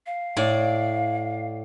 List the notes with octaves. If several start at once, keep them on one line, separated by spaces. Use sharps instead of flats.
F5
A2 D5